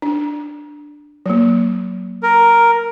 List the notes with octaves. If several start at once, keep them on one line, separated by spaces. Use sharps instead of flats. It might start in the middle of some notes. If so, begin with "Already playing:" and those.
D4
F#3 A#3
A#4